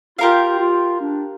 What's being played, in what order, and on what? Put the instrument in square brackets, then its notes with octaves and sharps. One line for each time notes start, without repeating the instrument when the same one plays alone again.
[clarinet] F4 [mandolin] G4 A#4 F5
[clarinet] F4
D4